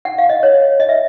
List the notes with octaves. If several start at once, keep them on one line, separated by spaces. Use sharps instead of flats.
F#5
F5
D#5
C#5
D#5
E5